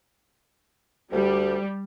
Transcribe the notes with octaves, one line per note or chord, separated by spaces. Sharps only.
D2 G3